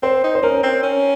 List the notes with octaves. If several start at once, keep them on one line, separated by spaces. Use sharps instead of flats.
C4 C5
D#4
C5
C#4 A#4
C4
C#4